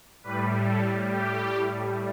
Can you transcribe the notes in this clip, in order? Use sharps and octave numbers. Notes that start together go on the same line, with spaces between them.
A2 G3 B4
A4
G4